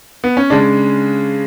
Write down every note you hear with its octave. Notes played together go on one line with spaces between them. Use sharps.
B3
C#4
C#3 G#3 D4